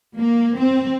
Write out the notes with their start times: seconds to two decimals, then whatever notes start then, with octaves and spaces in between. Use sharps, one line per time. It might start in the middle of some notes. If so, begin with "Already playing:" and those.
0.17 A#3
0.58 C4